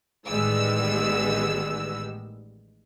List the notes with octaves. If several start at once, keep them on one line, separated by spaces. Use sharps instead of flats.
A1 D#3 G3 G#3 B3 E6